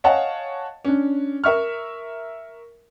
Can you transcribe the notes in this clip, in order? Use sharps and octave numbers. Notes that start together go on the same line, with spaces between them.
C#5 D#5 F5 F#5 G#5 A5
C#4 D4
A#4 E5 C#6 F6